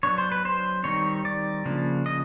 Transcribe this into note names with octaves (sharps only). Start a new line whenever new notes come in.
F#3 B3 D4 C#5
C5
B4
C5
D#3 G3 C4 D#4 C#5
D5
C#3 F3 A#3 D4
D#5